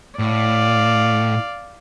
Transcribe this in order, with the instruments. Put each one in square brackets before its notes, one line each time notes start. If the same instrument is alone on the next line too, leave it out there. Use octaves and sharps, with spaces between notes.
[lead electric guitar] A2 [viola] D5 F5